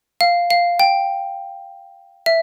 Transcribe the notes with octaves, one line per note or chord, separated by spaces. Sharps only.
F5
F5
G5
E5